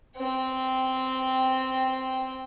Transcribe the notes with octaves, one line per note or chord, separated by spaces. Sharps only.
C4 G5